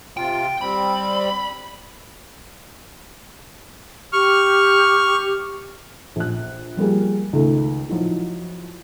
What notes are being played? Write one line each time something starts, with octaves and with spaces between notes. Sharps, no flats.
C3 F4 G5
G3 C4 B5
G4 C#6 F6
A#1 F#6
F3 G3 A#3 G#4
C#2 D#3 A3
F3 F#3 D#4 E4